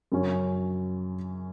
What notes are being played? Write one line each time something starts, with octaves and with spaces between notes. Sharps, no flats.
F#2 C#3 F#3 C#4